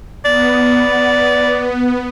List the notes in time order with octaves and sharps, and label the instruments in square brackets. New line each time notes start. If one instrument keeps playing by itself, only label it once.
[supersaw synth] B3 [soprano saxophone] D5